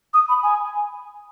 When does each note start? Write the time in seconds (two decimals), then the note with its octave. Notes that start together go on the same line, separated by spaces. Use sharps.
0.13 D#6
0.28 B5
0.42 G#5